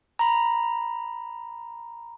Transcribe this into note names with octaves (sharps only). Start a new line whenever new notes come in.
A#5 B5